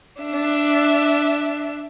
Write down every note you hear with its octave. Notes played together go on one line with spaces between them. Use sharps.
D4 E5